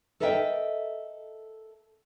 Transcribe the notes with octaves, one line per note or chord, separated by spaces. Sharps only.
A4 A#4 D#5 E5 F#5 G5